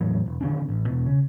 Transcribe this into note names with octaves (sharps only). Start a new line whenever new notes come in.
E2 A2 F#3
E1
D3 D#3 C4 D4
A1
E2 B2
C#3